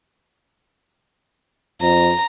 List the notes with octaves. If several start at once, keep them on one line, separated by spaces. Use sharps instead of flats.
F2 A#5